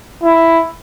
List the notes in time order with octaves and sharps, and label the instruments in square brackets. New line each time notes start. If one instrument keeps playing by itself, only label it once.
[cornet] E4